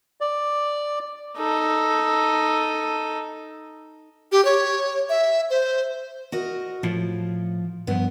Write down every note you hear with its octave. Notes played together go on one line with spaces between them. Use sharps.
D5
D#4 A4
G4
C#5
E5
C5
F#4 A#4 D#5
A2 F3
G2 F3 B3